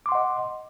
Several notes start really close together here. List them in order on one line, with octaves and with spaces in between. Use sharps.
D6 C6 F#5 D#5